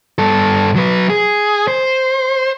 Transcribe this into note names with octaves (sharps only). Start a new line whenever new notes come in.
G2 A4
F#3 B4
G#4
C5